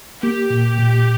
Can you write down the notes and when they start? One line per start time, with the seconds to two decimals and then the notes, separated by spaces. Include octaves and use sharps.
0.22 A#3 G4
0.50 A#2
0.79 A#2